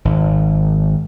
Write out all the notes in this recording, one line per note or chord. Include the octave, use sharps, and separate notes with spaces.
G#1